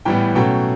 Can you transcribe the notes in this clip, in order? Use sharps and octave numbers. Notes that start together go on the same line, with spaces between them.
A2 E3 G3 B3 G5
B2 F#3 A3 C#4 G5